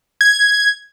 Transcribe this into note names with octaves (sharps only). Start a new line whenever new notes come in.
G#6